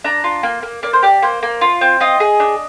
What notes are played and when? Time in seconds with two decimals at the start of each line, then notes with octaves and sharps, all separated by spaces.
0.04 D4 A#5
0.24 F4
0.43 A#3
0.63 A#3
0.83 A#3 D5
0.93 C5
1.03 G4 D5
1.22 A#3 C5
1.43 A#3
1.61 F4
1.81 C4
2.00 F4 D#5
2.20 G#4
2.40 D4